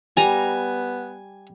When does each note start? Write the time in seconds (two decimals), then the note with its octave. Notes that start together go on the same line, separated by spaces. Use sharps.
0.17 G3 B3 G#5 A#5